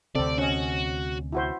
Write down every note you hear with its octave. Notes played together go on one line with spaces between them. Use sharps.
D2 C3 C4 A4 D5
C#4 F#4 D#5
E4 F#4 C5